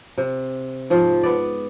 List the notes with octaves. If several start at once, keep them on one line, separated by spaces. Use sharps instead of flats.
C3
G#2 F3
B3 B4 D5